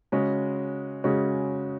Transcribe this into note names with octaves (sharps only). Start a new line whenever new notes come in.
C#3 G#3 C#4 F#4
C#3 G#3 C#4 F#4